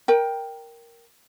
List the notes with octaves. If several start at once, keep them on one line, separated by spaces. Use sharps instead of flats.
A#4 G5